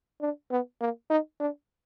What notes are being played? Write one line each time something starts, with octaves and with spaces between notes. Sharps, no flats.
D4
B3
A#3
D#4
D4